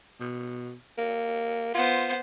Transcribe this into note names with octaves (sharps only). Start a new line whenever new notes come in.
B2
A#3
B3 F4 C5